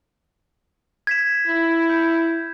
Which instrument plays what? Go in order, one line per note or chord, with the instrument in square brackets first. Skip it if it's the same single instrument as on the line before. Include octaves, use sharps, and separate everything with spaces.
[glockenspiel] G#6 B6 E7
[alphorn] E4
[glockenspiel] G6